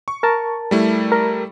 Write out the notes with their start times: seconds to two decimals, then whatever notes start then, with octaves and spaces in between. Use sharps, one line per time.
0.08 C#6
0.23 A#4 A5
0.71 G3 A3 E4
1.12 A#4